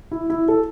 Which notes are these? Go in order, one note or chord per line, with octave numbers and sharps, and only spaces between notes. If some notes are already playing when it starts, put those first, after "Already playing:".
E4
E4
A4